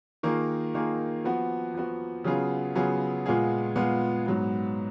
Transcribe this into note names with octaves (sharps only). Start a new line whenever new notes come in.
D#3 A#3 F4 G#4
D#3 A#3 F4 G#4
F3 B3 F#4
F3 B3 F#4
C#3 F#3 B3 F4 G#4
C#3 F#3 B3 F4 G#4
A#2 G#3 B3 F4 G#4
A#2 G#3 B3 F4 G#4
G#2 F#3 B3